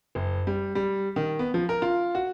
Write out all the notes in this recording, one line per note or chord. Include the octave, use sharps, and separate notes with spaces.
F#1
G3
G3
D#3
B3
F3
A#4
F4
F#4